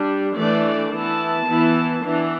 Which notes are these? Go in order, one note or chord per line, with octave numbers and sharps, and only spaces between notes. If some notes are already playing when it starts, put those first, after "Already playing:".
Already playing: G3 D4
E3 A3 D4 D5
E3 B3 E4 A5
E3 B3 E4
E3 B3 D4